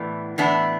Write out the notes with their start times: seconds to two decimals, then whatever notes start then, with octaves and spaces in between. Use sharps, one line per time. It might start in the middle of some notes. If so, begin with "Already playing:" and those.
Already playing: A2 E3 B3 D4
0.38 A2 E3 B3 D4